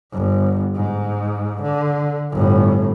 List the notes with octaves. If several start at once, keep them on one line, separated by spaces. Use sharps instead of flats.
G1
G#2
D3
G1 A2